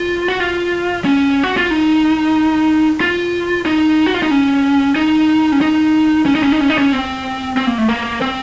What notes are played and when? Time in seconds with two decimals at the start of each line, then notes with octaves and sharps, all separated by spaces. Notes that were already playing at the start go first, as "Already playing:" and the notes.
Already playing: F4
0.28 F#4
0.40 F4
1.05 C#4
1.43 F#4
1.57 F4
1.70 D#4
3.01 F4
3.66 D#4
4.06 F#4
4.14 F4
4.23 D#4
4.31 C#4
4.96 D#4
5.52 C#4
5.61 D#4
6.26 C#4
6.35 D#4
6.43 C#4
6.52 D#4
6.61 C#4
6.70 D#4
6.78 C#4
6.92 C4
7.57 C4
7.67 A#3
7.78 A3
7.89 A#3
8.21 C4